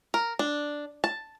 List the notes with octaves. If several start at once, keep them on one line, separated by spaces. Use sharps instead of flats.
A#4
D4
A5